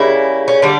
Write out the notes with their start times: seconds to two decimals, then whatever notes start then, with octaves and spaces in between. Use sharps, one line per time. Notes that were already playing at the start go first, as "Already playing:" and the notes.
Already playing: C#3 G3 A#3 E4
0.48 C#4
0.62 D3 G3 D4